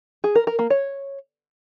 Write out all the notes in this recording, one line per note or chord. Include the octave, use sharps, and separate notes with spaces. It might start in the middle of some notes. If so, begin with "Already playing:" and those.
G#4
A#4
A#4
A#3
C#5